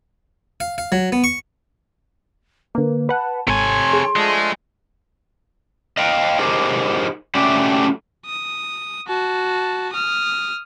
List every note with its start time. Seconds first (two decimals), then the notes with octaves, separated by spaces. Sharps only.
0.60 F5
0.78 F5
0.92 F#3
1.12 B3
1.24 C#6
2.75 D3 A#3 B4
3.09 B4 F#5 A5
3.48 G#1 C3 A4 C#5 G#5 C6
3.93 G#4
4.16 F3 G#3 A3 D4
5.97 D#5 F5 G5
6.39 D#4 G4 G#4 A#4 C5
7.35 A3 C#4 F#4 G4 D5 E5
8.26 D#6
9.08 F#4 A5
9.93 D#6 F6